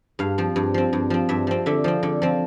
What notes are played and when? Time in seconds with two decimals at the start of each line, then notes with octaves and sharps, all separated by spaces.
0.19 G2 F5
0.38 F3 C4
0.56 G2
0.74 F3 C4
0.93 G2
1.10 F3 C4
1.29 G2 E5
1.47 F3 C4
1.66 D3 E5
1.84 F3 C4
2.03 D3
2.22 F3 C4